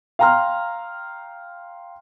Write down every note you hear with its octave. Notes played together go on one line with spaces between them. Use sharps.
F5 G5 A#5 C6 F6